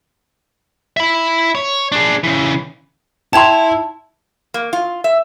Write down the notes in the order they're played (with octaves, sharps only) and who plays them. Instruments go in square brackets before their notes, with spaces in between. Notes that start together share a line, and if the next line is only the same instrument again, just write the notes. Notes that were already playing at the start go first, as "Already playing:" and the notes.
[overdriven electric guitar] E5 B5
C#5
D4 G#4
C#3 E3
[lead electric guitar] E4 [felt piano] G5 C6 [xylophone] A5 G#6 F7
[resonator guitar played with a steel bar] A#3
F4
E5